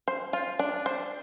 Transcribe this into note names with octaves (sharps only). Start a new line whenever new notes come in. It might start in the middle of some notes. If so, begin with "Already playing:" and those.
C5
F4
D4
C5